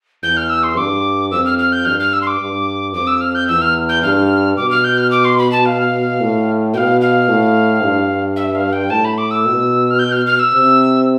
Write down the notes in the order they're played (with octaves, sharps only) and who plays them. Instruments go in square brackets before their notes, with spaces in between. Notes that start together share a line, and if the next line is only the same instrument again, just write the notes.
[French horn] E2 [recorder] G6
[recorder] F6
E6
C6
[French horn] G2 [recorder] D6
[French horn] F2 [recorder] E6
[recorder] F6
F6
G6
[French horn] G2 [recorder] F6
[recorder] F6
E6
C6
D6
[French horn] G2
[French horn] F2 [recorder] D6
[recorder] E6
F6
G6
[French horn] E2 [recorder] E6
[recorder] F6
G6
[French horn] G2 [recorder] F6
[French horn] B2 [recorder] D6
[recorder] F6
G6
F6
D6
C6
B5
A5
F5
[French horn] A2
[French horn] B2 [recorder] F5 G5
[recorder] F5
[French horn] A2
G2
[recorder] E5
F5
G5
[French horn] A2 [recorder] A5
[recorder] B5
D6
E6
[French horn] B2
[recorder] F6
G6
F6
F6
E6
[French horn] C3